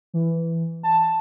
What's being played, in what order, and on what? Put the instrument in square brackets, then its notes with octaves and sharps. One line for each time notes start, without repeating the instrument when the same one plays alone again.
[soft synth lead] E3
A5